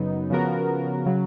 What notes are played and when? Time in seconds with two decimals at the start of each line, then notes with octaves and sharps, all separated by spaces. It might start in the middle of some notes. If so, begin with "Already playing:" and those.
Already playing: F#2 C#3 F#3 B3 D#4
0.30 C#3 F3 B3 F#4 A#4
1.06 C#3 F#3